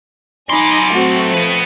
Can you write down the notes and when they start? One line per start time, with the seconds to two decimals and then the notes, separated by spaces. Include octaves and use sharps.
0.50 F#3 D#4 G#5 B5 C6 D6
0.93 A3 C4 F#4
1.34 F3 B4 D#5